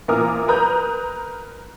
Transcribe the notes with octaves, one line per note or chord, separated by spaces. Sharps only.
A#2 E3 A#4 D6 D#6 F6
A#4 B4 A#5 D#6 G6